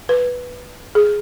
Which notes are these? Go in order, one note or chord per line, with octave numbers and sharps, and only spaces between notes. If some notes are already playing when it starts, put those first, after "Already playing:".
B4
G#4